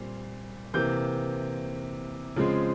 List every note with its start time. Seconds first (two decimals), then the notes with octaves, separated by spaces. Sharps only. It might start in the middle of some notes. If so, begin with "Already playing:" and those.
Already playing: A#2 G3 C4
0.74 C3 E3 A#3 G6
2.36 C#3 F3 G#3 C4